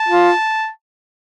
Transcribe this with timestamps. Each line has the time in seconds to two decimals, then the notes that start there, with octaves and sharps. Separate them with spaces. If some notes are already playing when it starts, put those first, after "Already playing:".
Already playing: A5
0.09 F4